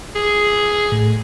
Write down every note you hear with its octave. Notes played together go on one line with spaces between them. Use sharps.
G#4
A2